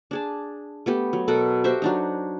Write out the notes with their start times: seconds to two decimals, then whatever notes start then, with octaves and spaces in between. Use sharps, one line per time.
0.11 D4 G#4 A5
0.86 A3 B3 G4
1.13 F#3
1.28 B2 A4 A#4 F#5
1.64 F#4 G4 C5 E5
1.82 F#3 D4 D#4